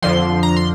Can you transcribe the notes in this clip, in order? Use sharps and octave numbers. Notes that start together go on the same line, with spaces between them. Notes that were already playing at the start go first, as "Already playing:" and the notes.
F2 D3 F3 C6
A#5
C6